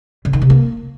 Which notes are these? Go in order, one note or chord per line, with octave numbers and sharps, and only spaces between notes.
D3
D#3
C3
A#3